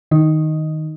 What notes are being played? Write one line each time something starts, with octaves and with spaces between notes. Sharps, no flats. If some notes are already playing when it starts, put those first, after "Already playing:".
D#3 D#4